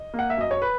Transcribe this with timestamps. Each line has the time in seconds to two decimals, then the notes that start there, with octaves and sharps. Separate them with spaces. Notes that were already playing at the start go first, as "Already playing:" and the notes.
Already playing: D#5
0.13 A#3
0.19 F#5
0.30 E5
0.37 F#2 D#5
0.51 C#5
0.62 B4